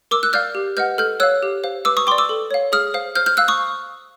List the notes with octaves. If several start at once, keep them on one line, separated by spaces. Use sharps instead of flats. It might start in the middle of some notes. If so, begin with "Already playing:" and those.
A#4 D6 E6
E6 F#6
D5 F5 F6 G6
G4
B4 D#5 F#5 F6 G6
A4 F6 G6
C#5 F5 E6 F#6
G4
C5 F5
B4 D6 E6
C#6 D#6
D5 G5 C6 D6
D6 E6
A4
C#5 F5
G#4 D#6 F6
C5 F5
C5 F6 G6
F6 G6
F5 E6 F#6
C#6 D#6